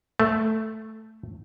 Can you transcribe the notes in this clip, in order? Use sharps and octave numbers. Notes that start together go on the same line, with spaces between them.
A3